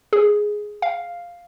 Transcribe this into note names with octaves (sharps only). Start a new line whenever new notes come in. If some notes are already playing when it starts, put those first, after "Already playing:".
G#4
F5